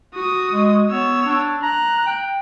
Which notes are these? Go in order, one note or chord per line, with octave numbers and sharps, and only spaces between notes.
F#4 D#6
G#3
B3 C#5 E6
D4
A#5 F#6
G5